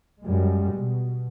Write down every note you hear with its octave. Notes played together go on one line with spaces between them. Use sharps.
F#2 G3 G#3
B2